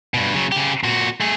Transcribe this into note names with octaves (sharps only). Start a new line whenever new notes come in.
G2 B2
C#3 F#3
C#3 G4
A#2 F#4
A3 G#4